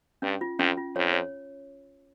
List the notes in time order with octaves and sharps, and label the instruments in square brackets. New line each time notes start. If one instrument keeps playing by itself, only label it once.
[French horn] G2 [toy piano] C#4
[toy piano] F4
[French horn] F2 [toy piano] C#4
[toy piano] F4
[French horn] F2 [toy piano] C#5
[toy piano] C#5